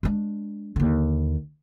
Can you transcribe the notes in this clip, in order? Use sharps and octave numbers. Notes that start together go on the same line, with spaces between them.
G#3 D4
D#2 D3